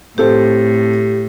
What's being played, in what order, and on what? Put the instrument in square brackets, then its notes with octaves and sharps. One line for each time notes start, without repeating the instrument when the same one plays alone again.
[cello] A2 [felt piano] C4 A4 C5 [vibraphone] G4